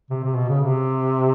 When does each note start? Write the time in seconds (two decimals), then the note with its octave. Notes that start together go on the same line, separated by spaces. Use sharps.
0.10 C3
0.24 C3
0.36 B2
0.49 C#3
0.61 C3